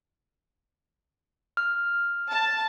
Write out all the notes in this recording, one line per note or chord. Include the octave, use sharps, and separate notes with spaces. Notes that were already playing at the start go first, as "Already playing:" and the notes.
F6
A5